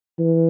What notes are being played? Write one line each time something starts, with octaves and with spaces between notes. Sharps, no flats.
E3